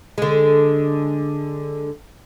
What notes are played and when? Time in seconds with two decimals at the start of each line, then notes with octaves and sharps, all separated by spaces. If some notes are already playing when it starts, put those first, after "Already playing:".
0.18 D3 G#3